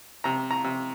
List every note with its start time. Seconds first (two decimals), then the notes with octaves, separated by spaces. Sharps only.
0.24 C3 A#5
0.51 A#5
0.64 C3